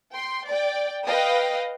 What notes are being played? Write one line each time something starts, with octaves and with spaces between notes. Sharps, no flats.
G5 C6
D5 G5
B4 D#5 F5 G5 D#6